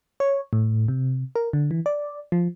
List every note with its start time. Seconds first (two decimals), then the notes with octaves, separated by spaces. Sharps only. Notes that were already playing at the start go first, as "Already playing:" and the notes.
0.20 C#5
0.53 A2
0.88 C3
1.36 A#4
1.53 D3
1.71 E3
1.86 D5
2.32 F3